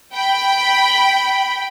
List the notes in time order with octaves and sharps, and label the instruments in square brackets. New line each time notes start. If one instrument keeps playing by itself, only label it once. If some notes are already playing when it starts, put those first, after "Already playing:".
[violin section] G5 B5